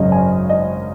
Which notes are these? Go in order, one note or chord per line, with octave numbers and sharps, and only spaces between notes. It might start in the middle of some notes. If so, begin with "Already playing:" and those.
Already playing: G#1 F#2 C#3 D#5
G#5
D#5